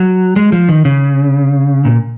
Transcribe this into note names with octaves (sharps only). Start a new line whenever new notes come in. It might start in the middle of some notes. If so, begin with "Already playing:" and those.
Already playing: F#3
G#3
F3
D#3
C#3
A#2